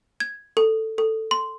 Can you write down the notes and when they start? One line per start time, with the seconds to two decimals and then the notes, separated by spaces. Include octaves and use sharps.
0.20 G#6
0.57 A4
0.98 A4
1.31 C6